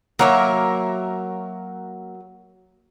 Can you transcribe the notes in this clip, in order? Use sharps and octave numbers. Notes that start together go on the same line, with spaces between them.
F#3 A#3 A#4 C#5 E5